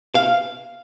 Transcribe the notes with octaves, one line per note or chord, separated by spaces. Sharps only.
F5